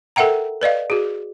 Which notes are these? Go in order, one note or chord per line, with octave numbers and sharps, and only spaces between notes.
A4 A#4 E5 F#5 G5 A#5
B4 D5 D#5 F5
F#4 G#4